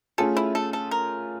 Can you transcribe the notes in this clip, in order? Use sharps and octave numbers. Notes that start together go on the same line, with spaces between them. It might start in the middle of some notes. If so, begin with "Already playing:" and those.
A3 C#4 F4 G#4 A4
E4
A4
A4
A#4